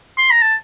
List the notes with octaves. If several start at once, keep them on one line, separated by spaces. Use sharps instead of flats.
C6
A#5
A5